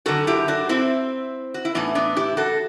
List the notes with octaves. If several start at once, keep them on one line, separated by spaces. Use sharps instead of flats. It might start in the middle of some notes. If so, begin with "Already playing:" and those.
F#2 D3 F#4 A4
E4 G4
D4 F#4
C4 E4
F#4
E4
A2 E3 B3 D4
B3 D4
E4 G4
F#4 A4